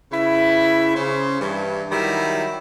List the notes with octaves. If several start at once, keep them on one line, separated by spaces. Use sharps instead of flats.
C#3 E4 B4 E5
C#3 C5
G2 E3
D#3 F#3 G3 E4